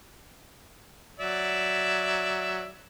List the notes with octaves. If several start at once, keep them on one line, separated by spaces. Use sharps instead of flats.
F#3 D5 E5